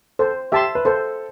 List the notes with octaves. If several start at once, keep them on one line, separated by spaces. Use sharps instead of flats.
A4 C5
G4 E5 A5 C6
B4
A4 C5